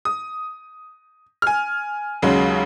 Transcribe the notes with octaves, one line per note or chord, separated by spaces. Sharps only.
D#6
G#5 F6
D#2 C#3 F#3 G#3